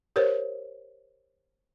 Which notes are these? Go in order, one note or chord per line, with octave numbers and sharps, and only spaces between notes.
G4 A#4 C5 C#5